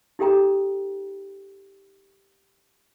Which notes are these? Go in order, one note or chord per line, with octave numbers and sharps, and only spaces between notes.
D#4 G4 A4 G5 A#5